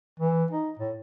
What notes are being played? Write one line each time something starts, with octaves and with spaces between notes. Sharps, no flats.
E3
D#4
A2